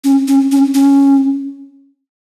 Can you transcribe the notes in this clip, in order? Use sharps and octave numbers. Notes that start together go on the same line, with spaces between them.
C#4
C#4
C#4
C#4